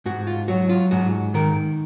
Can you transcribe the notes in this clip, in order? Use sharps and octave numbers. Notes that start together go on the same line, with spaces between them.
G#2 F#4
F4
F#3 F#4
F4
G#2 F#4
D#3 A#4